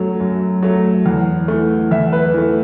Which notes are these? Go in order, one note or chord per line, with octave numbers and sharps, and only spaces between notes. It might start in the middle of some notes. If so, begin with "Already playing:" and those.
Already playing: F#2 F#3 A3
F#2
F#3 A3
E2
E3 A3
E2 E5
B4
E3 A3